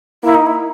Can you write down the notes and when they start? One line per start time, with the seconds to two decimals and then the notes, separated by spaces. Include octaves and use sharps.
0.24 A#3 E4
0.35 D#4
0.46 E4